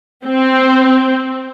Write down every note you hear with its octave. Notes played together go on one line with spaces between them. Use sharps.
C4